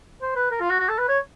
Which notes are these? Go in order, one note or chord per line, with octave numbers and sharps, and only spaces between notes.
C5
B4
A#4
F4
F#4
F#4
A4
B4
C#5